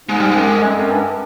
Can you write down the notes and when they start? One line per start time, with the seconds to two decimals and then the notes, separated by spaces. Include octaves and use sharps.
0.09 G#2 G#3
0.20 G3
0.31 F#2 G#3
0.64 F2
0.78 F#2
0.91 G2